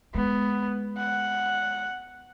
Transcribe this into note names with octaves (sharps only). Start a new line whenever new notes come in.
G#3 B3
F#5